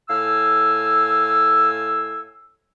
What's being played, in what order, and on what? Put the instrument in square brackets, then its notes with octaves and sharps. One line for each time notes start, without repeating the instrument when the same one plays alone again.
[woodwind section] A2 F5 G#5 E6